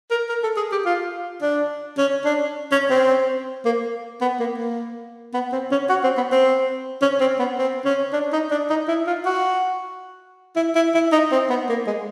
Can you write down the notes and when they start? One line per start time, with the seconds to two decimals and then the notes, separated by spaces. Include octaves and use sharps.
0.11 A#4
0.29 A#4
0.43 A4
0.57 G#4
0.72 G4
0.86 F4
1.42 D4
1.98 C#4
2.25 D4
2.72 C#4
2.91 C4
3.65 A#3
4.21 B3
4.40 A#3
4.58 A#3
5.34 B3
5.53 C4
5.71 C#4
5.89 F#4
6.04 C4
6.17 B3
6.32 C4
7.02 C#4
7.20 C4
7.39 B3
7.58 C4
7.85 C#4
8.13 D4
8.33 D#4
8.51 D4
8.70 D#4
8.88 E4
9.07 F4
9.26 F#4
10.56 E4
10.75 E4
10.95 E4
11.12 D#4
11.32 C4
11.50 B3
11.69 A#3
11.87 G#3